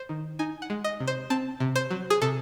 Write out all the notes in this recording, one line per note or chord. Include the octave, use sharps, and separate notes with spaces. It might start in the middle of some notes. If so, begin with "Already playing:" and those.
Already playing: C5
D#3
D#4 G#5
F#5
G#3
D#5
C3
C5
C4 A5
C3
C5
F#3
G#4
C3 A4